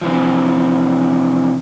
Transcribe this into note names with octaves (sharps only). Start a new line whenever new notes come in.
C3 E3 F3